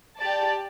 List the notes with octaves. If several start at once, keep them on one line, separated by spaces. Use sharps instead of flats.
G4 D5 A5